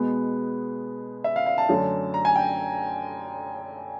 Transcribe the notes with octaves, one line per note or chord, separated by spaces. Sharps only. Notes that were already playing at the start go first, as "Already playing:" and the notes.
Already playing: B2 G#3 B3
E5
F5
F5
A5
F#2 D3 F#3 A3
A#5
G#5
G5